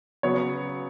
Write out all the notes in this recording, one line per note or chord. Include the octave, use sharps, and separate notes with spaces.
C#3 F#3 B3 C#5